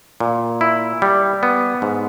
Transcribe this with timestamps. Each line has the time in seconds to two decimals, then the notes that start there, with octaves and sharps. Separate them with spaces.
0.20 A#2
0.61 E4
1.02 G3
1.43 B3
1.82 G#2